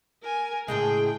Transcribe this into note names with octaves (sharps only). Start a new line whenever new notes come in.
A#4 G#5
A2 C#3 G#3 G#4 G5